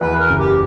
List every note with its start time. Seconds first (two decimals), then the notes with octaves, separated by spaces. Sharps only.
0.01 E2 B4
0.19 A#4
0.29 F#1
0.38 G4